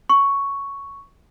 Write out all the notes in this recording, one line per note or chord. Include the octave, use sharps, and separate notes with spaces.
C#6